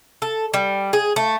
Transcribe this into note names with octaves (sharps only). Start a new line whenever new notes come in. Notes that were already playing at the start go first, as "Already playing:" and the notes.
A4
G3
G#4
A3